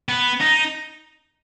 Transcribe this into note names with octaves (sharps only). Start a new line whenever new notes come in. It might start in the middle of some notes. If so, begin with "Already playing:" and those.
B3
D#4